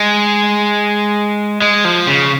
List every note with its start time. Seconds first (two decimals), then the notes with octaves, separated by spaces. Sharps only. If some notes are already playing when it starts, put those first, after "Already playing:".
Already playing: G#3
1.62 G#3
1.85 F3
2.07 C#3